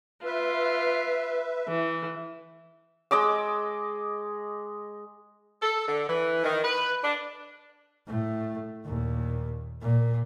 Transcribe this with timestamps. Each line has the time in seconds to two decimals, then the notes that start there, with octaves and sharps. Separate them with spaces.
0.24 F4 B4 E5
1.69 E3
3.11 G#3 D#5 D6 E6
5.62 A4
5.88 D3
6.09 E3
6.44 D#3
6.64 B4
7.04 D4
8.07 A2 A3
8.84 D#2 A#2
9.82 A#2